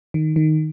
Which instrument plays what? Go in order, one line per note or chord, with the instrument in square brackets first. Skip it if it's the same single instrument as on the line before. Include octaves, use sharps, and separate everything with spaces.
[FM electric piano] D#3
D#3